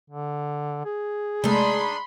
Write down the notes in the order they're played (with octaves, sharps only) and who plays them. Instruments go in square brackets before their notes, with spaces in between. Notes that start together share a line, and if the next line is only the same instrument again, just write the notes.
[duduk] D3
G#4
[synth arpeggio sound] C3 G#3 A3 [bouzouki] D4 D#4 [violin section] B5 C6